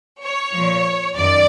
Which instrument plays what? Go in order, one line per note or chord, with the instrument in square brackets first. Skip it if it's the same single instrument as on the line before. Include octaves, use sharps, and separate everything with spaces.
[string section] C#5
A#2 F3
F#2 D#3 D5